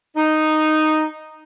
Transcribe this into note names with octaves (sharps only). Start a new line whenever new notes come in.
D#4